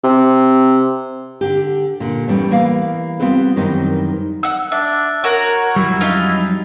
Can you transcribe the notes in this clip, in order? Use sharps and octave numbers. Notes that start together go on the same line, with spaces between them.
C3
D3 G4
A#2 D3
E2 A2 G3 C#4 D#4
E3 A#3 B3 D5 F5
G3 B3 C4 F4 A4 B4
F#2 D#3 E3 G3 C4 D#4
F#5 E6
D4 E5
F#4 A#4 C#5 A#5
F2 F#3 G3 E4
C#4 D#4 F4